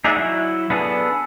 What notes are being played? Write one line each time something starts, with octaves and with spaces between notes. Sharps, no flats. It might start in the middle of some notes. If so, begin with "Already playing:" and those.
D#4 G#4 D5 E5 F#5
F#3 E4
B3 D4 G#4 A4